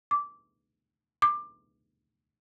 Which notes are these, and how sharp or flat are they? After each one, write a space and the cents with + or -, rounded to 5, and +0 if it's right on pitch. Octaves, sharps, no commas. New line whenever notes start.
D6 -15
D6 +20